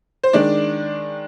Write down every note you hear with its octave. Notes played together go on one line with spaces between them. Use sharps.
C5
D#3 G#3 D4 D5